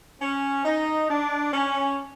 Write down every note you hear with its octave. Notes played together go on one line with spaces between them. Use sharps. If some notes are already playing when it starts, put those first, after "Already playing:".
C#4
D#4
D4
C#4